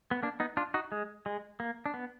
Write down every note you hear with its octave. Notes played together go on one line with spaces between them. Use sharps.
B3
A#3 D4
B3 D#4
D4 F4
D#4 F#4
G#3
G#3
A#3
D4
B3